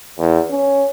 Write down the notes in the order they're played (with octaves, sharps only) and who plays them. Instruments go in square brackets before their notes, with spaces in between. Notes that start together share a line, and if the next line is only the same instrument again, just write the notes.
[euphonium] E2
C#4